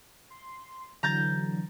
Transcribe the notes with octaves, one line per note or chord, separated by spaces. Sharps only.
C6
D3 E3 F#3 A#5 G6 A6